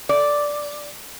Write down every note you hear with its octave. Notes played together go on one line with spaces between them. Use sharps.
D5